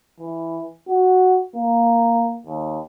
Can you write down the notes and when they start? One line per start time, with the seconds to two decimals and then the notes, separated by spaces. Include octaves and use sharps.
0.20 E3
0.88 F#4
1.56 A#3
2.46 D#2